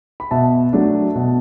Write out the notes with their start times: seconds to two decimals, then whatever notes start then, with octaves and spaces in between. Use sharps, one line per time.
0.20 B5
0.31 B2 E5 A5
0.73 F#3 A3 D4
1.15 B2